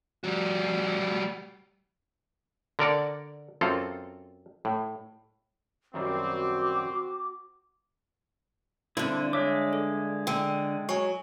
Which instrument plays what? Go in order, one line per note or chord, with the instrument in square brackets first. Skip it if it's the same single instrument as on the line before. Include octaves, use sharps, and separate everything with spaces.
[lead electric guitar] G3 F#4
[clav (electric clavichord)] D3 A#4 D5 F#5
F#2 C4 F4 A4
A2
[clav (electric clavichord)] F#2 D#3 G3 [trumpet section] C4 [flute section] F#4 D6
[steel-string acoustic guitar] G2 D3 [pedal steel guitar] C4 D4 E4
[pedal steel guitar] G#3 E5 D6 [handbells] C#5
[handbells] A4
[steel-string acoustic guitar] D3 [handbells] G5 E6
[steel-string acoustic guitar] F#3 [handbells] G#5 C#6